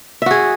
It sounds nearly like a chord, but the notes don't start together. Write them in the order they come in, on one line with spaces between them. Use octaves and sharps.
E5 F#4 G#4